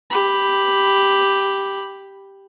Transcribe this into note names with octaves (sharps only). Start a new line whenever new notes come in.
G4 B5